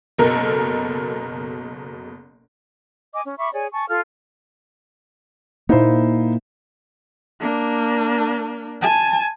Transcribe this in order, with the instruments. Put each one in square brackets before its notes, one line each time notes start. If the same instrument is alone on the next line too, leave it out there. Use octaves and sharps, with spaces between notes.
[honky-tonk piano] F#1 B2 A4 A#4
[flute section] D#5 G#5 D6
C#4
E5 B5 C#6 D6
G#4 C#5 D5 G#5
G#5 A5 C#6
F4 A4 F5 F6
[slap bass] A#2 A#3 [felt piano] D#4 E4 C5
[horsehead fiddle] A#3 D4
G#5 A5